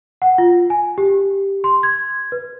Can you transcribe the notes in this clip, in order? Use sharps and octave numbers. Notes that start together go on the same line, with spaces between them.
F#5
F4
G#5
G4
C6
G#6
B4